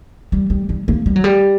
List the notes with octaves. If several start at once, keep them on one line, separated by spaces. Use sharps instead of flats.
G3
G3
G3
A#3
G3
F#3
G3